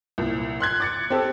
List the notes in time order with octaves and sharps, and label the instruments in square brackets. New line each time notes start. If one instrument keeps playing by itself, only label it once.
[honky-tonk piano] C2 A#2
C6 F#6 G#6
D6 A6 C#7
C4 G4 A4